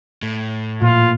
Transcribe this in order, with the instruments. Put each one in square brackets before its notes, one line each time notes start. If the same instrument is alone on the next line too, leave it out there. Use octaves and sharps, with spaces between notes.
[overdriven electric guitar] A2
[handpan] A#2 [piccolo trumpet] F4